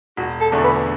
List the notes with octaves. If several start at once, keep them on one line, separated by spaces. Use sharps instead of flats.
E1 F#4
A4
E2 D3 A3 D4
B4